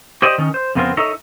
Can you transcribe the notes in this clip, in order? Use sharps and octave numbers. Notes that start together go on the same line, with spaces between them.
G4 C5 D5 D#5
D#3 C#4 D#4
C5
F2 C#3 B3 C4 F4 A#4
D#4 A4 A#4 C#5 D#5 E5